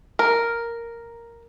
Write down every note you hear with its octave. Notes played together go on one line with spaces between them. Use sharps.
A#4